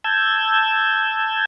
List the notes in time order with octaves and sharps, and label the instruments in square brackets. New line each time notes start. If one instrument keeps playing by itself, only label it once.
[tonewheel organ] A5 E6 G6 G#6